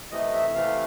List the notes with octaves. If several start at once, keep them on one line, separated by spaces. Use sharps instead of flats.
C3 E3 A3 D#5
E5
C3 E3 A3 F5